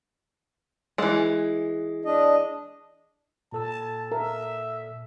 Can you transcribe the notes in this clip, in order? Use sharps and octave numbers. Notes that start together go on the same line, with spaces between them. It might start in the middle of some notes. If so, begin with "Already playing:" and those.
E3 G#3
D4 D#5
A#2 A4 A5 E6
A#4 E5